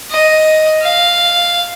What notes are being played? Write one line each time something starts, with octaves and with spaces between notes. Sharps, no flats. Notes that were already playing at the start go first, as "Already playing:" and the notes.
D#5
F5